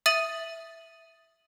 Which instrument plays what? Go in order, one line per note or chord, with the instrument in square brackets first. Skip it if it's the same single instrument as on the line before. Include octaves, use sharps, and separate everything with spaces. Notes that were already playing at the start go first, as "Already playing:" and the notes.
[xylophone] E5 D#6 A6 D#7 F#7